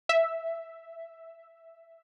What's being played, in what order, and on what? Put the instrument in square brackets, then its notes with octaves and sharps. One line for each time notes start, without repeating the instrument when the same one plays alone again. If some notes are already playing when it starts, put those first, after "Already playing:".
[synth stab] E5